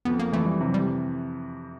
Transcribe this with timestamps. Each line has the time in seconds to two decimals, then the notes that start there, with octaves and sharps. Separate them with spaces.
0.05 F2 B3
0.19 A#3
0.33 E3 A3
0.46 G3
0.60 C3 F#3
0.74 G3